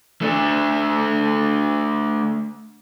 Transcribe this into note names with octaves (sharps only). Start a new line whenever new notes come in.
A3 D4